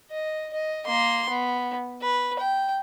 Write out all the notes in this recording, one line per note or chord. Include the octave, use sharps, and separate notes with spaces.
D#5
D#5
A#3 C6
B3
B4
G5